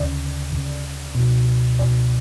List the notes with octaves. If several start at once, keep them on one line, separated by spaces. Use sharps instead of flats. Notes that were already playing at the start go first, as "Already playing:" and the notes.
Already playing: D2 C#3 D5
D2 C#3
C#2 B2
C#2 B2 D5